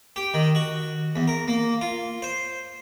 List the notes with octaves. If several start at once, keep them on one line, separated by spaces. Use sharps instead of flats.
G4
D#3
F#4
E2
A#4
A#3
F4
C5